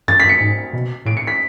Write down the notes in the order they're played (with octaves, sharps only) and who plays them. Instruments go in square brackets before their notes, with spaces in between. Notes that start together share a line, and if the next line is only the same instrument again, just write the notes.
[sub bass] F#2 [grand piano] A6
[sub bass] F#2 [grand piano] B6
[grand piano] C#7
[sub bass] G#2
B2
[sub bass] A2 [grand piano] D7
[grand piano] C#7
B6